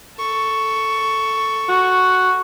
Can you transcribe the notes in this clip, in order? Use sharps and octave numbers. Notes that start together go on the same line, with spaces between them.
A4 C#6
F#4